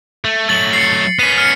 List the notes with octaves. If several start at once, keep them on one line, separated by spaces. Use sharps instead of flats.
A3
F#3 A3 A6 F#7
C7 C#7
B3 C#4 B6 D#7
F6 C7 C#7